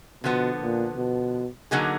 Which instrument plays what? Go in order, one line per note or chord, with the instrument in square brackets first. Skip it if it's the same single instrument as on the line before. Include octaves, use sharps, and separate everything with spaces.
[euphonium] B2 [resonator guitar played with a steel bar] D3 F3 B3
[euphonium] A#2
B2
[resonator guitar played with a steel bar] D3 F#3 A#3 D#4 G#4